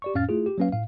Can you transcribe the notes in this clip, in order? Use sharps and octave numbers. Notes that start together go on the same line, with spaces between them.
G4 D5 C#6
F2 A2 C#4 F5 F6 A6
A3 E4 F4 G#4
G4
F#3 A#3 C#4 B4 F5
A2 F5